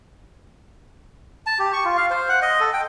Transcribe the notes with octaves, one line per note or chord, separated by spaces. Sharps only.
A5
G4
C#6
F4
F5
C5
F#5
D#5
A4
G5